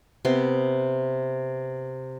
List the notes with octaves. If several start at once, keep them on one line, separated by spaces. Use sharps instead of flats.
C3 B3 C6